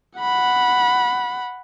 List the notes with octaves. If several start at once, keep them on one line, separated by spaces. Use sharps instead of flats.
F#5 B5